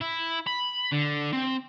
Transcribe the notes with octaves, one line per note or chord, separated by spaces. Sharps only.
E4
B5
D3
C4